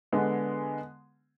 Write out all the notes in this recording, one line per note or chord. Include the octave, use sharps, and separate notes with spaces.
D3 G#3 B3